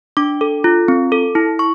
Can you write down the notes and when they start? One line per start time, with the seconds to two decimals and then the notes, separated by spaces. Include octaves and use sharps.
0.17 D4 D6
0.41 A4
0.64 F4
0.88 C4
1.12 A4
1.35 E4
1.59 C#6